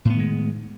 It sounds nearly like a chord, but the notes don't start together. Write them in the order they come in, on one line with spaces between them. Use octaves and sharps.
A2 B3 D#3 G#3